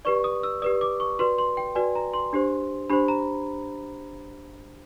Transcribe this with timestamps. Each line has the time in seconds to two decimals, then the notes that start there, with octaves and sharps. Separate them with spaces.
0.05 G4 B4 D5 C#6
0.24 D#6
0.43 E6
0.62 G4 B4 D5 D#6
0.81 D6
1.00 C#6
1.19 F#4 B4 D5 C6
1.38 C6
1.57 G5
1.75 F#4 B4 D5 G#5
1.95 A#5
2.14 C6
2.33 D4 G4 C5
2.90 D4 G4 C5 B5
3.08 A#5